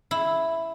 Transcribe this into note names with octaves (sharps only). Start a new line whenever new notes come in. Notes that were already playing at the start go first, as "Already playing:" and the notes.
E4